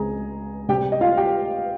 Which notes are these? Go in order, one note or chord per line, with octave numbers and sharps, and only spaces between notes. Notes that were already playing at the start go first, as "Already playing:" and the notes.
Already playing: C#2 C#3 G#3 C4 G#4 G#5 A#5
C3 G3 C4 G4 G5
D#5
F4 F5
G4 G5